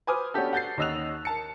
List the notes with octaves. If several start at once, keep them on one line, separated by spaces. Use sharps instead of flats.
B4 C5 G#5 D6 D#6 F6
B3 C#4 D4 F#4 G4 A4
F#5 G6 A6 C7
D#2 C#4 D#5 E6 F#6 F7
A#4 A5 C#7